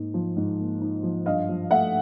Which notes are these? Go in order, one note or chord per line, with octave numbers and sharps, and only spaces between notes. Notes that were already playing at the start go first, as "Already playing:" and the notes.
Already playing: G#2 A#3 D#4
F3
G#2
A#3
D#4
F3
G2 D#5 F5
F3
A3 E5 F#5